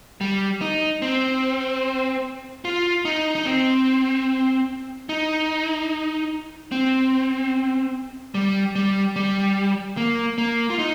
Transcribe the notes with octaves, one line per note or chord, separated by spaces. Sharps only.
G3
D#4
C4
F4
D#4
D#4
C4
D#4
C4
G3
G3
G3
A#3
A#3
F4
D#4